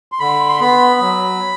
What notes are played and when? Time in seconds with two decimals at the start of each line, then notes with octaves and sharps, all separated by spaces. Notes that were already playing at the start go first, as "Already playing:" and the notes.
0.12 C6
0.19 D3 B5
0.49 C6
0.60 B3 B5
1.00 F#3